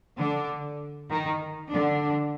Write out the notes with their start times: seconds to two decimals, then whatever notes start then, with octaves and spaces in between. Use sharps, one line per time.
0.18 D3 D4
1.11 D#3 D#4
1.73 D3 D4